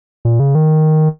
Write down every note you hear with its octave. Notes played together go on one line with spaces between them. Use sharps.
A#2
C#3
D#3